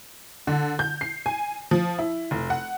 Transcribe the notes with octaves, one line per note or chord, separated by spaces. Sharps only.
D3
G6
C7
G#5
F3
E4
F1
F#5